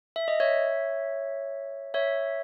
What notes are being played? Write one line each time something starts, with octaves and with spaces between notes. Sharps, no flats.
E5
D#5
C#5 E5
C#5 E5